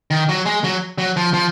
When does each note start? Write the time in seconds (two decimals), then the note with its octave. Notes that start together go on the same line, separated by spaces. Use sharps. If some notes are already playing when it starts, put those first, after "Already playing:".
0.11 D#3
0.29 F#3
0.45 G#3
0.64 F#3
0.98 F#3
1.16 F3
1.33 F3